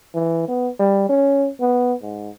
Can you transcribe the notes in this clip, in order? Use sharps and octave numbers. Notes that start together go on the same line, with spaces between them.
E3
B3
G3
C#4
B3
G#2